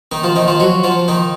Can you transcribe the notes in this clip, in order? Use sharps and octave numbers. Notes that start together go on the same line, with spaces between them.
D#3 D#4
F3 F4
D#3 D#4
F3 F4
F#3 F#4
F3 F4
D#3 D#4